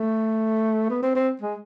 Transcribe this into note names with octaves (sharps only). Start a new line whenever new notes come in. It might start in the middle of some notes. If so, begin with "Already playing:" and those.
Already playing: A3
B3
C4
C4
G#3